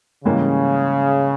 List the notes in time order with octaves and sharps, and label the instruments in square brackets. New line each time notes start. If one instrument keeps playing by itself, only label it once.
[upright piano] G#2 E3 G3 A#3 C#4 [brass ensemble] C#3